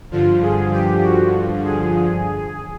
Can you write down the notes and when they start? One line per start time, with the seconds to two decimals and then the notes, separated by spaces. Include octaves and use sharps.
0.11 G2 D3 F3 F4
0.42 G#4
0.72 G4
1.03 F#4
1.64 G#4